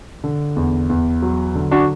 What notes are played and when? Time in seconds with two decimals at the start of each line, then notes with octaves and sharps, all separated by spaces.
0.24 D3
0.56 E2
0.90 E2
1.22 F#3
1.55 D3
1.71 D4 F#4